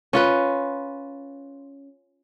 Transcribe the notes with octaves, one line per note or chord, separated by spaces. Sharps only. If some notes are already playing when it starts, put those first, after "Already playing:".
C#4 F4 B4